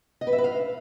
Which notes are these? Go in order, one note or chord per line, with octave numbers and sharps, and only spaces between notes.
D#5
B4
E5
B4
F5